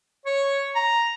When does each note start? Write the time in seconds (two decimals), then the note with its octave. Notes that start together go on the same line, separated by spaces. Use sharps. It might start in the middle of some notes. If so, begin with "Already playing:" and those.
0.26 C#5
0.75 A#5